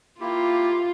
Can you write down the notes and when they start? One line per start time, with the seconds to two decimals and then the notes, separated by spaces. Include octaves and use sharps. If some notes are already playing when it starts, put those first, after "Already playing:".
0.21 A#3 E4 F4 G4